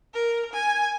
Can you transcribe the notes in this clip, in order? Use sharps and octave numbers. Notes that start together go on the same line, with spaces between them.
A#4
G#5